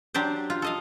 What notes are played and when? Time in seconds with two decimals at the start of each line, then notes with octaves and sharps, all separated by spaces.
0.14 F#3 D4 G4 C5
0.50 F4
0.62 A4 D#5 F5